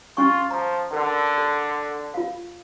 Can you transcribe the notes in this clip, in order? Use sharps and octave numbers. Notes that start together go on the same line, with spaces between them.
C#4 F4 G#5 C#6
F3 A#5
D3 A#4 B5
A4
F4 F5